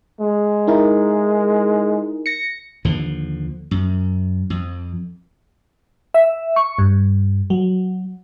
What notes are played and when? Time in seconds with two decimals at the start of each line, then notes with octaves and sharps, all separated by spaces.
0.20 G#3
0.67 D#4 E4 A#4
2.26 A#6 C#7
2.85 D#2 D3 F3
3.71 F#2
4.50 F2
6.14 E5
6.56 C#6
6.78 G2
7.50 F#3